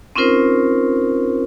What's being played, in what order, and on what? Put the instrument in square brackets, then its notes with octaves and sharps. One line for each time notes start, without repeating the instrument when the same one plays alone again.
[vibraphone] C4 C#4 D#4 F4 A#4 C5